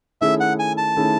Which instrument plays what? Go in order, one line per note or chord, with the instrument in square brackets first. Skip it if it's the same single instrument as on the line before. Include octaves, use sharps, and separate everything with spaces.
[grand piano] D#3 A3 C#4 E4 G#4 [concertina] E5
[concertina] F#5
G#5
A5
[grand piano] D#3 A3 C#4 E4 G#4